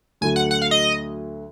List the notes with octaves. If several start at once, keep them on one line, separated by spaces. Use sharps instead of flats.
D2 D3 F#3 G#5
F#5
F#5
F5
D#5